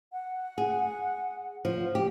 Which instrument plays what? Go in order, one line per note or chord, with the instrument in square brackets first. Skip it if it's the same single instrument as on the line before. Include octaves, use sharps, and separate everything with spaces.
[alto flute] F#5
[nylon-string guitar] G#4
F3
G4